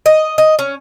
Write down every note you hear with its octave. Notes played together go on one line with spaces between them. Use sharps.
D#5
D#5
C#4